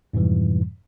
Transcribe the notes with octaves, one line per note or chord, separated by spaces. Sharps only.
F2 G#2 B2 E3 G3